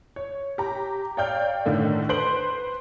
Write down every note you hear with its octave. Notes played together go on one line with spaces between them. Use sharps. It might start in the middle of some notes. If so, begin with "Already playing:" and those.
C#5
G4 A#5
C#5 D5 F5 G5 F6 G6
A2 D3 D#3 A3
B4 C5 C6 D7 F#7